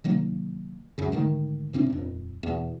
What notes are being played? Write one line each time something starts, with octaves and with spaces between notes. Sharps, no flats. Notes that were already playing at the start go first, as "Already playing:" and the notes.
C3 D#3 F#3 A#3
C#2 F#2 C#3
G#2 D3 D#3 A3
G#2 C3 C4 D4
D#1 F2
E2 B2